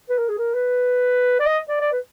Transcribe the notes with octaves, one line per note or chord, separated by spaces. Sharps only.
B4
A#4
G#4
A#4
B4
D5
D#5
D5
D5
B4